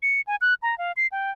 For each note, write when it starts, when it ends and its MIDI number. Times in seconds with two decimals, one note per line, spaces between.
0.02 0.21 97
0.27 0.36 80
0.41 0.54 90
0.62 0.78 82
0.78 0.92 77
0.97 1.07 96
1.12 1.31 79